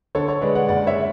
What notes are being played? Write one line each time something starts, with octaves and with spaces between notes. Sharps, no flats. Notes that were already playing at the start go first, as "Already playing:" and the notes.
D3 A4 C#5
A4 C#5
G#3 B4 D5
D5 F#5
F#1 D5 F#5
C#5 E5